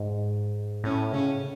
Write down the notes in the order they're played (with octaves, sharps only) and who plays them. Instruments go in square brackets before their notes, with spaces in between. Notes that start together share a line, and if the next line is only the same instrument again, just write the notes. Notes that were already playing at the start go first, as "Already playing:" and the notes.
Already playing: [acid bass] G#2
[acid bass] A2 [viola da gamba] C#4
[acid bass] C#3 [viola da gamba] C#4